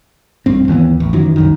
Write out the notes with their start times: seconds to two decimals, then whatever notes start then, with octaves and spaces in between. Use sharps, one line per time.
0.46 A#1 G2 C4
0.68 D#2 E3 B3
1.00 A1
1.13 F#2 D#3 E3 F#3
1.36 C2 F#2 D#3